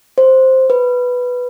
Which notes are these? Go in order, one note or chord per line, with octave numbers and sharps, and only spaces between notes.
C5
B4